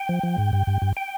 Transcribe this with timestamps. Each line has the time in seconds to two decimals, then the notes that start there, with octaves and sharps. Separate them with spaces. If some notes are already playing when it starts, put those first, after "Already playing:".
Already playing: G5
0.09 F3
0.23 F3
0.38 G#2
0.53 G2
0.67 G2
0.82 G2
0.97 G5